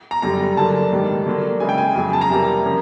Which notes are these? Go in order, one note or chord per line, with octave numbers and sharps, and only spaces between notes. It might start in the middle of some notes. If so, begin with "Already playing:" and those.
A#5
F#2 D3 G3 A#5
F#2 D3 F#3 A#3 A5
G#2 D#3 G3
D3 F#3 A#3
C#3 E3 G#3 G#5
G5
G#5
F2 C#3 F#3 G#5
A5
A#5
C3 E3 G3 A#3
F3 A#3 C#4